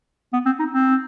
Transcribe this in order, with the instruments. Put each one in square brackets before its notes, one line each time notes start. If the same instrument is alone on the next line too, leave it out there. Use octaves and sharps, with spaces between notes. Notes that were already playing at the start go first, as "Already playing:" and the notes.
[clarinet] B3
C4
D#4
C4